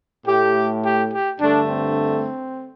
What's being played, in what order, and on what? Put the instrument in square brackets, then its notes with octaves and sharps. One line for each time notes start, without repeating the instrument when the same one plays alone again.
[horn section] A2 A3 G4
G4
G4
G2 D3 A3 D4
C4